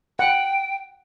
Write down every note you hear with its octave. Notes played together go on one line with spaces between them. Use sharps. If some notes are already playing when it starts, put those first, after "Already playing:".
F#5 G5